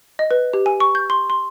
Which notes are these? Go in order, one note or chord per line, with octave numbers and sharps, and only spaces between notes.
D#5
B4
G4
G#5
C#6
G6
C6
C6